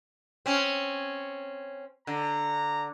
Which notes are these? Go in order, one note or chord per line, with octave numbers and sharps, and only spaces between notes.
C4 C#4
D3 A#5